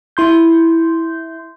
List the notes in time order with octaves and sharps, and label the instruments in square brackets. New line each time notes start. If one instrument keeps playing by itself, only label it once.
[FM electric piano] E4 C6 G6